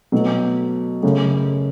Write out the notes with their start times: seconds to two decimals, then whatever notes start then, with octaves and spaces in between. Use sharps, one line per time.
0.12 B2 F#3 A3
1.03 F#2 C#3 A3